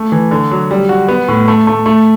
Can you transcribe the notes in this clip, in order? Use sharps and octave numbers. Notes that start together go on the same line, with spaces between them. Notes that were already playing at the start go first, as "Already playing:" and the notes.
Already playing: A3
E3
D3
F#3
G3
F#4
B3
A2
A3
A3
A3